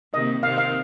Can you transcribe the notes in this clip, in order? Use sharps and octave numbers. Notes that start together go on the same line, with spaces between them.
C3 D#3 A#3 D#5
C3 D#3 C4 F5
F5